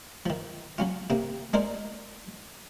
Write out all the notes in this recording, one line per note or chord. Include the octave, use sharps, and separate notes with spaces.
D#3 F3
F#3 C#4 F4
C3 A#3
G#3 D4 D#4 A#4 C5 D5